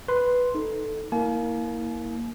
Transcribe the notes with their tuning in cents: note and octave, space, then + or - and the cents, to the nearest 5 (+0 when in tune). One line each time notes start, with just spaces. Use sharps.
B4 +0 C6 +0
D#4 +0 A4 +0
A#3 +0 E4 -30 G#5 +45